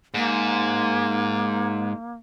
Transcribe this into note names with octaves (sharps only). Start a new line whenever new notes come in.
G#2 A#3